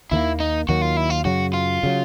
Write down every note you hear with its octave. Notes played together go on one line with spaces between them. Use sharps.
D#2 D#3 F#3 A#3 E4
D#4
D#2 D#3 F#3 A#3 F#4
F4
E4
F4
F#2 C#3 F#3 F#4
F4
C#3 F#3